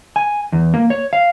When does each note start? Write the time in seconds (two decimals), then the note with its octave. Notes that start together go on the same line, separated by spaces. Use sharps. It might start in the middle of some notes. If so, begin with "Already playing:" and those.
0.16 G#5
0.52 E2
0.74 A#3
0.90 C#5
1.13 F5